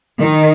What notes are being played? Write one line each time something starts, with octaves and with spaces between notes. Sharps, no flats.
D#3